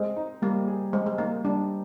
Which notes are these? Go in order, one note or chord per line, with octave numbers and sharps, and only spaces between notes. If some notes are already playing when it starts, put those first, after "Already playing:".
Already playing: G#3 C4
D#4
G3 A#3
G#4
G#3 C4
G#3
A#3 D#4
G3 D4